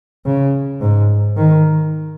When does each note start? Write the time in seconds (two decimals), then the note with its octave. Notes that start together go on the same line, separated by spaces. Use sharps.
0.26 C#3
0.81 G#2
1.37 D#3